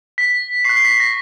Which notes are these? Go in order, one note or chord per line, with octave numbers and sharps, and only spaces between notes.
B6
C#6 F#6 C7
C7
B6
C7
A#6